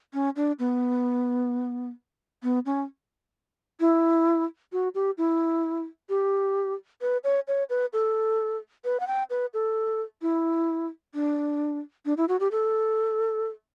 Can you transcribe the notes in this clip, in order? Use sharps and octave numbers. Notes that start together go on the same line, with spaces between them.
C#4
D4
B3
B3
C#4
E4
F#4
G4
E4
G4
B4
C#5
C#5
B4
A4
B4
F#5
G5
B4
A4
E4
D4
D4
E4
F#4
G4
A4